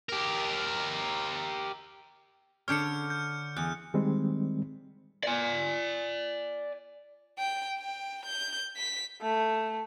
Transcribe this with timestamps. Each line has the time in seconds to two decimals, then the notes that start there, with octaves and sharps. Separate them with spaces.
0.09 G4 A#4
2.68 D3 D4 C#5 F6 G6 C#7
3.10 G6
3.57 E2 F#6
3.94 D#3 G3 G#3 C4
5.23 D5 G#5
7.39 G5
7.78 G5
8.26 G6
8.77 B6
9.22 A3